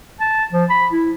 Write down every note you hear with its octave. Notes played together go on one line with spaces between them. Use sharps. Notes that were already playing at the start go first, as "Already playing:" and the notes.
A5
F3
B5
E4